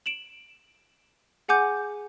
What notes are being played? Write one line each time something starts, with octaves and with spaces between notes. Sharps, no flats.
D7 E7 F#7
G#4 F#5 G#5 D6 G6